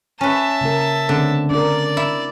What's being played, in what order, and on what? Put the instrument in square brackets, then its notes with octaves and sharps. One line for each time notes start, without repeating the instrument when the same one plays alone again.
[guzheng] C#4 B4 [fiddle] E5 A5
[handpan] C#3 A#3 A#4
[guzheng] D3 [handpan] A3 C4 C#4
[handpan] D4 A#4 [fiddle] D5
[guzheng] E4